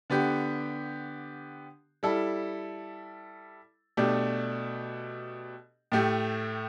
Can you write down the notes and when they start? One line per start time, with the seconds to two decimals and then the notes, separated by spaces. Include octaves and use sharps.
0.10 D3 B3 G4
2.03 G3 E4 A4
3.97 B2 A3 D4 G4
5.92 A2 A3 G4